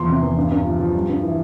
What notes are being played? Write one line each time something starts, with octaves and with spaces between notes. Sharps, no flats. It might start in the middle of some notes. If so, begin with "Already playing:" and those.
Already playing: E2 F3 C6
C3
E2
G2
G2
F3
F3
G3
G2
E3